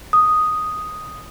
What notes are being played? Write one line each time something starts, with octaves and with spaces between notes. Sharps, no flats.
D#6